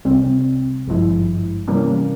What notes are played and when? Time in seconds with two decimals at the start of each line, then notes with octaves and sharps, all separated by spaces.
0.05 C2 C3 G3 C4
0.86 G#1 G2 F3 G#3 E4
1.68 C3 E3 G3 A#3 C#4